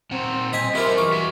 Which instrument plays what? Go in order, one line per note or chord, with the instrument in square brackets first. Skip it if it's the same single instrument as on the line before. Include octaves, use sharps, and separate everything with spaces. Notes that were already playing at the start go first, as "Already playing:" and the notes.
[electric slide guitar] A#2 F#5 A#5 [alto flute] C4
[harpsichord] D#4 G#5 [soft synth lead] B6
[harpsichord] E4 F4 C5 [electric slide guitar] G4 D#5 [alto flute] A#4
[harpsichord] E2 D6 [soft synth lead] C#6
[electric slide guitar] F#4 E5